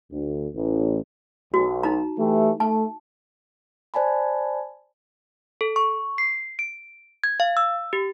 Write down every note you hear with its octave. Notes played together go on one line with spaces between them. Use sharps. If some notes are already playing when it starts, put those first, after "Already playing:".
D2
A1
B1 F#4
D#4 A#5
E3 A3 G4
A3 A5
C5 D5 G#5 A5 B5
A4
C#6
C7
D7
G#6
F5
E6
G4